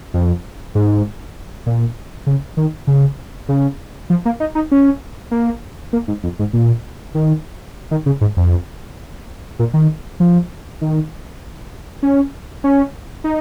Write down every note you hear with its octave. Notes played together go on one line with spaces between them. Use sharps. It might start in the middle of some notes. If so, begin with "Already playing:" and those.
F2
G#2
A#2
C#3
D#3
C#3
C#3
F3
A#3
D#4
D#4
C#4
A#3
A#3
G#2
F2
G#2
A#2
D#3
D#3
C#3
G#2
F2
A#2
D#3
F3
D#3
C#4
C#4
D#4